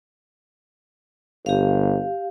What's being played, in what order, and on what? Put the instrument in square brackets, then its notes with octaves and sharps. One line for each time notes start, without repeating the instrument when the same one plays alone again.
[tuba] G1 [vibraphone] G4 F5